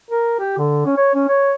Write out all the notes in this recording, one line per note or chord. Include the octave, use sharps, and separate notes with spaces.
A#4
G4
D3
C#4
C#5
C#4
C#5